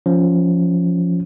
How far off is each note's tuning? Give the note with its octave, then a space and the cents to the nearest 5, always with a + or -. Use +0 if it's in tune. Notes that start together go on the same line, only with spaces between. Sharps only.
F3 +0 C#4 +10